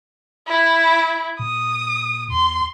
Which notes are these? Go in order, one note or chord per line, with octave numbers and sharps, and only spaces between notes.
E4
A#2 D#6
E2 C6